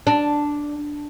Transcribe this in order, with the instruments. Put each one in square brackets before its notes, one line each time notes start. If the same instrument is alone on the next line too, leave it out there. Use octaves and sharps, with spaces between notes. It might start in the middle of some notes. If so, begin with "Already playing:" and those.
[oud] D4